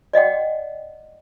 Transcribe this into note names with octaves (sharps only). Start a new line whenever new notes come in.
D5 D#5 F#5 G5